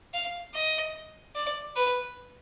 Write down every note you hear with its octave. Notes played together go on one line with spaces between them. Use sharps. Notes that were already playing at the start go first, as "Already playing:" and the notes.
F5
D#5
D5
B4